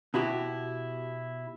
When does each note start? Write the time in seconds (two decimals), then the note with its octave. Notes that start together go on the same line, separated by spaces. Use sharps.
0.14 B2 E4 F#4 G4